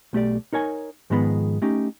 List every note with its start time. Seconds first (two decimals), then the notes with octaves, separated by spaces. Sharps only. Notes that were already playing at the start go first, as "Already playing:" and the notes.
0.13 B1 A3 G4 D5
0.53 D#4 A#4 C#5 G#5
1.10 G#2 D#3 F3 G#3 B3 B5
1.62 A3 C#4 D#4 G4